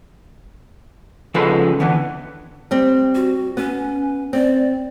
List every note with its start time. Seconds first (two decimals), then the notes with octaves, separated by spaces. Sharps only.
1.34 C#3 F3 G#3 D#4 A4 B4
1.80 D3 E3 B3
2.71 G3 C4
3.15 F#4
3.57 B3 C#4
4.33 C4 D5